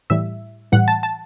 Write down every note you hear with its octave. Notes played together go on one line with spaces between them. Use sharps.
A2 E3 G3 E5
A2 E3 G3 F#5
A5
A5